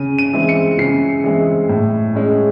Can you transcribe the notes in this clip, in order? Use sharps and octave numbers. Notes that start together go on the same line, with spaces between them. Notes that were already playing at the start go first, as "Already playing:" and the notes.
Already playing: C#3 D#7
D#7
E3 G#3 C4
C#7
C#3 C7
E3 G#3 C4
A2
G#3 C#4